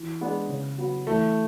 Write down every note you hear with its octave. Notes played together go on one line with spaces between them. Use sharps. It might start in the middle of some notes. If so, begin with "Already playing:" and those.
Already playing: E3
G#3 B3 D4 G#4
C#3
F#3 B3
E3 A3